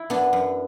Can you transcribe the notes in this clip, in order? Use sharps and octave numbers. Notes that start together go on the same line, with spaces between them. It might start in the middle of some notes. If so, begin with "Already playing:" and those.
Already playing: E4
F#2 B3 D4
F#2